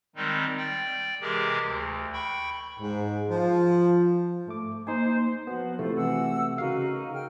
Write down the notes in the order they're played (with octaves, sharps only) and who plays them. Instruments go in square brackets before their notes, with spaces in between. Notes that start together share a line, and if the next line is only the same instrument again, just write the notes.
[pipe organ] D#3 G3 G#3 C4 D#4
D5 G5
C3 E3 G#3 G4 G#4 A#4
D2
G5 B5 C#6
[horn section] G#2
F3
[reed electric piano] G#2 A3 D6
[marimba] A#3 [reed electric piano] D#4 G#5 [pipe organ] C5
[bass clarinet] F3 [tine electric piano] B3 [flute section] F#4
[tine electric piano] C3 A3 [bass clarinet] E4 [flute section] F4 C5
[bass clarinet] E3 [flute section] F#4 F#5 E6
[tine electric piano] C#3 F5 [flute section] D#4 A#4 [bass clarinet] F#4
[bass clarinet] C#3 [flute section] G5 F6